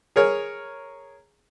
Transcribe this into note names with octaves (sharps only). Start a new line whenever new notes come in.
G#4 A#4 C#5